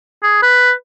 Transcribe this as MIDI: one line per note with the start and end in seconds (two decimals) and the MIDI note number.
0.23 0.39 68
0.42 0.72 71